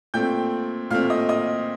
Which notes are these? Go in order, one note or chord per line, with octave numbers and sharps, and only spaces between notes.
A#2 A3 C4 G5 G6
A#2 A3 C4 F5 F6
D#5 D#6
D#5 D#6